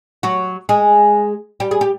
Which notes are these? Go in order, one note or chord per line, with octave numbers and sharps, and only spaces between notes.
F#3 F#4
G#3 G#4
G3 G4
G#4
G4